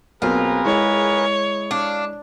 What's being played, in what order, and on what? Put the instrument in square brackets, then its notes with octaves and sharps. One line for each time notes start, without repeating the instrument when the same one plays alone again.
[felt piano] B1 A#3 C4 [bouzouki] F4 [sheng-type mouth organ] G#4 A#4 B4
[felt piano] G#3 E4 [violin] C#5
[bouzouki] D4 [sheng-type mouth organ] F5